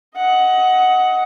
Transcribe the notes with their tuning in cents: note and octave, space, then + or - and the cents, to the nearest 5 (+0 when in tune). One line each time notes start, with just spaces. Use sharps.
D#5 +20 F#5 +5